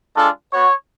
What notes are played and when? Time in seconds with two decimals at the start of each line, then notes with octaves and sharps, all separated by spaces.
0.16 G#3 D4 F4 A4
0.53 B3 F#4 C#5